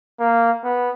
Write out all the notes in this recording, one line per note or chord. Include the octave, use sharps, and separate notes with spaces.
A#3
B3